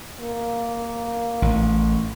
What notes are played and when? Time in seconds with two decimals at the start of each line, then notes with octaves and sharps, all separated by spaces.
0.20 A#3
1.42 A1